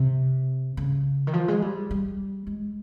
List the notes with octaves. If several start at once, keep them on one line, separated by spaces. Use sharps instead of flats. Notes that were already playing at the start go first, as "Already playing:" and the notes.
Already playing: C3
C#3
D#3
F3
G#3
G3
G3
G#3